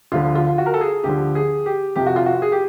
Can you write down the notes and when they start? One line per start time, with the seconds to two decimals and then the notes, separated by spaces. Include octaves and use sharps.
0.12 D2 D3 F3 F4
0.35 F4
0.58 F#4
0.66 A#4
0.74 A4
0.81 G#4
1.04 D2 D3 F3 G4
1.35 G#4
1.66 G4
1.95 F2 C3 F3 G4
2.06 F#4
2.16 F4
2.26 F#4
2.42 G#4
2.52 G4